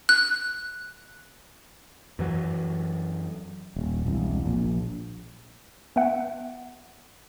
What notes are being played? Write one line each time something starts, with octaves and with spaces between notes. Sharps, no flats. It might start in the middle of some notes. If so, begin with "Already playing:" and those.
F#6
F#2 E3 F#3
D#1
E1 C2
A#1
B3 E5 F#5